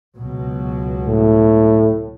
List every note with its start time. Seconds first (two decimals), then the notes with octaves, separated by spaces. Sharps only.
0.15 C#2 B2 F#3
1.07 A2